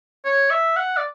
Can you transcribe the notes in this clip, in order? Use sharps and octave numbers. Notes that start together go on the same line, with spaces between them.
C#5
E5
F#5
D5